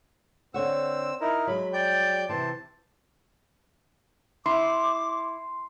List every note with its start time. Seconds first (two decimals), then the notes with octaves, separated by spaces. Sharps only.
0.54 D3 C4 C#5 F#5 E6
1.21 D#4 E4 A#4
1.47 F#3 G#3 B5
1.73 D5 G5 G6
2.29 C3 E3 C5 A5
4.46 E4 C6 D6